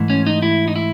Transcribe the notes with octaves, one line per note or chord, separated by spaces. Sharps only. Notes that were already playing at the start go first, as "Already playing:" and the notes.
Already playing: G#2 E3 A3
C#4
D#4
E4
D#4
E4